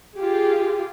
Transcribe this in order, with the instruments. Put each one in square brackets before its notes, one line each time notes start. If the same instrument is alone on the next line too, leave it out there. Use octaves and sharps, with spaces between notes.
[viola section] F4 G4 G#4